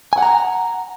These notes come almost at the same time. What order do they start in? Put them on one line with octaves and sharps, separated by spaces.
G#5 F#5 A#5